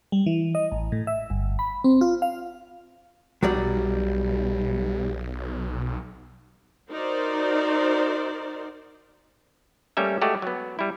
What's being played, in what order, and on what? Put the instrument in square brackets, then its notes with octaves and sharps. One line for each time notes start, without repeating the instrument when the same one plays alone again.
[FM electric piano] G3
E3
D#5
A1
A2
E5
G1
B5
C4
F4
F5
[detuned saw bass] B1 [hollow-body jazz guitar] F#3 G3 D5
[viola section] D#4 F#4 A#4 C5 D5
[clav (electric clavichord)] G3 A3 A#3 C#4 E5
G#3 A3 F#4 G4 D5
F#3 B3
G3 E4